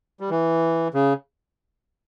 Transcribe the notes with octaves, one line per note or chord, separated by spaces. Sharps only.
G3
E3
C#3